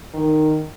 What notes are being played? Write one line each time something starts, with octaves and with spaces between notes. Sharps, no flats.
D#3